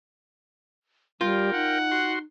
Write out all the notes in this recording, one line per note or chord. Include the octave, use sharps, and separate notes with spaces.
G3 F4 A#4 G5
D#4 F#5
F#4 C6